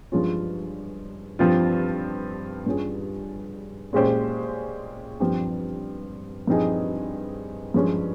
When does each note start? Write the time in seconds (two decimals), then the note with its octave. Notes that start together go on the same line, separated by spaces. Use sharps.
0.12 G2 F3 G#3 C#4 F4
1.39 G2 F3 C4 F4
2.66 G2 G3 C#4 F4 G#4
3.93 A#2 G#3 C#4 G4 C5
5.20 G2 F3 C4 G4
6.47 G2 F3 C4 D#4 G#4
7.74 G2 F3 G#3 C#4